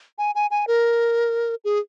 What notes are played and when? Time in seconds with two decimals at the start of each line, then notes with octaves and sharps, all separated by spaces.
0.18 G#5
0.35 G#5
0.51 G#5
0.67 A#4
1.65 G#4